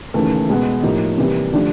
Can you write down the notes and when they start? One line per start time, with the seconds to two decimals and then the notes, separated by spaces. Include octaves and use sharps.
0.14 D#2 C#3 E3 A3
0.49 B2 G#3 B3
0.83 A2 F3 A#3 D#4 G4
1.18 C3 E3 G3 A#3
1.52 D3 F3 A3 D4 G4